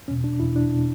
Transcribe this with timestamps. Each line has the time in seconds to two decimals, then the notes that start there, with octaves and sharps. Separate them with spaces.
0.08 E2 B2 C#4
0.24 D4
0.40 E2 B2 E4
0.56 D4
0.74 B2